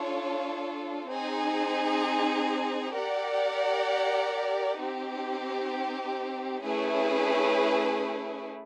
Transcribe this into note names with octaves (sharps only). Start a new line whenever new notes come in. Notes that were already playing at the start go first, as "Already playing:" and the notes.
Already playing: D4 F4 A4 C#5
C4 D#4 G#4
G4 A#4 D5 F#5
C4 D#4 G4
A3 C#4 E4 G#4 B4